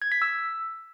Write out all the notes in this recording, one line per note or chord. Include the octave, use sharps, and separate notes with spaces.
G#6
B6
E6